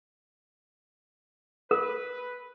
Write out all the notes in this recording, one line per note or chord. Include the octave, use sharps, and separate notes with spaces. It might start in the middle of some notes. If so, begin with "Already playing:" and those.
A#4 B4